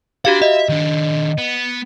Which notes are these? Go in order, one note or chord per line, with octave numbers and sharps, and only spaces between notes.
D4 F#4 G4 D5 F5
D#5 E5
D#3 D4
B3